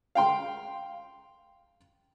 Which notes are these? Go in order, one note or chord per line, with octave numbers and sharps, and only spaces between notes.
F5 G5 C6